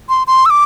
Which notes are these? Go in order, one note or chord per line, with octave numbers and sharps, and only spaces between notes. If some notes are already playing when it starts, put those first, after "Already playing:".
C6
C6
E6
D6